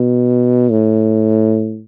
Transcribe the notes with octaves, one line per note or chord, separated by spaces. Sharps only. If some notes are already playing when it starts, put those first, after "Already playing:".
Already playing: B2
A2